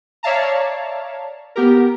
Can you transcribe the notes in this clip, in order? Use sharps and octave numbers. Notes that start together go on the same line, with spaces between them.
C#5 D5 E5 F5 A5 A#5
B3 G4 A#4